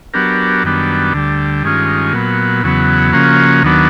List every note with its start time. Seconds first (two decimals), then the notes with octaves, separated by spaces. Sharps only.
0.14 F#3 B3 D4 G4 A#4
0.63 F#2 D#3 G3 B3 D4
1.13 D2 D3 G3
1.64 G2 D#3 G#3 C#4 F4
2.13 A#2 F#3 B3
2.63 E2 C#3 F#3 B3
3.13 C#3 F3 A#3 C#4 F#4
3.63 D#2 D#3 F#3 B3 D4